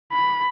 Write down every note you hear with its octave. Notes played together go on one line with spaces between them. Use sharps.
B5